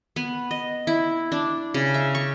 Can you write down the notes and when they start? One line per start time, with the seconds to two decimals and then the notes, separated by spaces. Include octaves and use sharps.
0.16 B3
0.51 D#5
0.87 E4
1.32 D4
1.74 C#3
1.94 E5
2.15 C#6